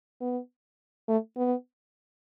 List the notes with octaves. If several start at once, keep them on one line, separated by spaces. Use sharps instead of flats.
B3
A3
B3